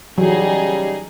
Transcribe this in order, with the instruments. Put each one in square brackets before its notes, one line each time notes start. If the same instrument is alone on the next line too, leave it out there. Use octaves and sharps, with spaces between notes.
[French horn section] C#3 G3 [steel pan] E3 F#3 [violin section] D#4 G#4